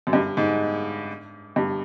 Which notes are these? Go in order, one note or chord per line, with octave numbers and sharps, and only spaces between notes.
F#2
G2
G#2
G2